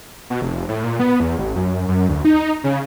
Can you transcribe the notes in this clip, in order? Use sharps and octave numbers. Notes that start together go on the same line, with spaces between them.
B2
F1
A2
A#2
B3
E2
A1
F#2
F#2
D2
D#4
C#3